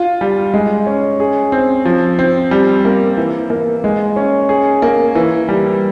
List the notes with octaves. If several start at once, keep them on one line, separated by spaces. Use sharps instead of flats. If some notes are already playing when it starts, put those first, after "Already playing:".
Already playing: F4
G3
G#3
C#4
G#4
C4
F3
C4
G3
A#3
E3
A#3
G#3
C#4
G#4
A#3
E3
G3